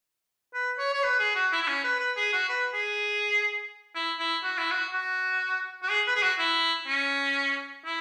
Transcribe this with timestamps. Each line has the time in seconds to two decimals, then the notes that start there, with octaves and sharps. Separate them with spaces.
0.54 B4
0.78 C#5
0.93 C#5
1.03 B4
1.19 G#4
1.35 F#4
1.52 E4
1.63 E4
1.68 C#4
1.84 B4
2.00 B4
2.17 G#4
2.33 F#4
2.49 B4
2.74 G#4
3.95 E4
4.20 E4
4.44 F#4
4.58 E4
4.71 F#4
4.93 F#4
5.83 F#4
5.90 G#4
6.07 B4
6.16 G#4
6.22 F#4
6.39 E4
6.88 C#4
7.85 E4